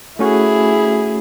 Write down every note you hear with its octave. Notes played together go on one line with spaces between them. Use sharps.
A3 C#4 E4 F#4 G#4